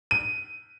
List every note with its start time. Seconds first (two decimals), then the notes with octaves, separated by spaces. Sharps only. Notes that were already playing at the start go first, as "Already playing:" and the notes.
0.11 D#7